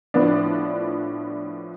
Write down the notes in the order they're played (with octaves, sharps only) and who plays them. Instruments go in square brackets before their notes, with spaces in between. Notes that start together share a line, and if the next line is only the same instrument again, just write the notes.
[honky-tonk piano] A2 F3 B3 D4